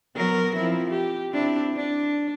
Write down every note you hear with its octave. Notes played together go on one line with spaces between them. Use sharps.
F#3 B3 A#4
F3 C4 E4
G4
C4 D4 E4
D4